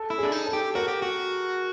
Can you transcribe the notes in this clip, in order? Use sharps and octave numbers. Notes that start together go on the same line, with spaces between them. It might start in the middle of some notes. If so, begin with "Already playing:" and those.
Already playing: A4
E4
D4 G#4
D#4
A4
G4
F#4 A#4
G4
F#4